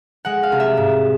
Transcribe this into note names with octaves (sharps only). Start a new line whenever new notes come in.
G#3 F#5
F5
C2
E5
G#2